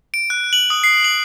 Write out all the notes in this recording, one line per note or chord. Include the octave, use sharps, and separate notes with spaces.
D7
F#6
F#7
D#6
C7
F#7